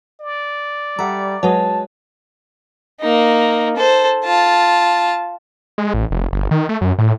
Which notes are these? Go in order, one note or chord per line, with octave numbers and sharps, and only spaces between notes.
D5
G3 A4 E5 F#5 A#5
F#3 G#3 B4 C#5 D#5 A5
A#3 D#4
A4 C5
F4 A5
G#3
A1
F1
G1
D#3
A3
F#2
A2